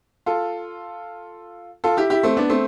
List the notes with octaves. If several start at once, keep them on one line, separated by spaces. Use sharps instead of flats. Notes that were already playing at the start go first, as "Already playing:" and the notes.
F4 A4
F4 A4
E4 G4
E4 G4
A3 C4
B3 D4
A3 C4